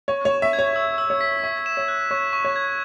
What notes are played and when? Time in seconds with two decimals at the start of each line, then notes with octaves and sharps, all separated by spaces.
0.08 C#5 C#6
0.25 C#5
0.30 E7
0.42 E5
0.53 G#6
0.59 C#5
0.76 E6
0.98 E6
1.10 C#5
1.21 B6
1.43 E5 C#6
1.66 E7
1.77 C#5
1.88 F#6
2.11 C#5 C#6
2.33 C#6
2.45 C#5
2.56 G#6